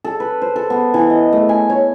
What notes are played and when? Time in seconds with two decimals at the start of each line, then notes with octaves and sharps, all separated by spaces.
0.04 A4
0.20 B4
0.42 C5
0.56 A4
0.70 B3
0.94 E3
1.10 D#5
1.33 A3
1.49 G#5
1.70 C#5